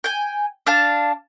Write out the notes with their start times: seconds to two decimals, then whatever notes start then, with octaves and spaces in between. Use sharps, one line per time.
0.04 G5 G#5
0.67 D4 F5 A5